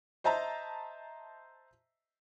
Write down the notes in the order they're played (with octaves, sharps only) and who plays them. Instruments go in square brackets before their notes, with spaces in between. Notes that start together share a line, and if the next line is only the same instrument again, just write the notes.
[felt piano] C5 D#5 E5 A5 A#5